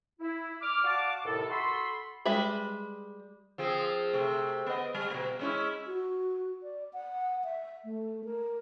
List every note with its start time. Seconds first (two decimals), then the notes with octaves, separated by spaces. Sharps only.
0.20 E4
0.61 D6 F6
0.84 F#4 D5 F5 A5 D6
1.25 D#2 A2 C3 A4
1.50 F#4 A4 B5 C6
2.26 G3 G#3 B4 E5 B5
3.58 F3 C4 G#4
4.13 C3 A3
4.66 B3 D#5
4.95 G3
5.10 B2 A3
5.39 G#3 C#4 E4
5.87 F#4
6.63 D5
6.93 F#5
7.44 E5
7.84 A3
8.25 A#4